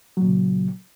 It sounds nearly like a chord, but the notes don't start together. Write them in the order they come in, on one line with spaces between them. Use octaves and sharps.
F#3 A#2 C#3